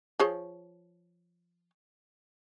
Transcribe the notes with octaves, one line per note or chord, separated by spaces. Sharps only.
F3 G#4 C#5